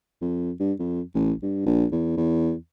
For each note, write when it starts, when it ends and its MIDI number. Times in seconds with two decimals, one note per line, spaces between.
0.22 0.51 41
0.60 0.73 43
0.79 1.01 41
1.15 1.32 33
1.43 1.63 43
1.66 1.85 34
1.92 2.12 40
2.17 2.54 40